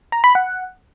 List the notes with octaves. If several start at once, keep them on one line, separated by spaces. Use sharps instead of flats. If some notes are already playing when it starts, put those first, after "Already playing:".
A#5
B5
F#5